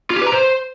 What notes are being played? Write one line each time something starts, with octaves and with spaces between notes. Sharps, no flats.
F4
G4
B4
A#5
C5